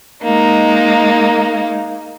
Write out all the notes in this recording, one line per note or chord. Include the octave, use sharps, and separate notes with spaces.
G#3 A#3 D#4